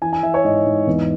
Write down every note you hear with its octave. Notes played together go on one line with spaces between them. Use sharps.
E3 G#5
G#5
E3 E5
C#5
G#2 D#5
G#2
E2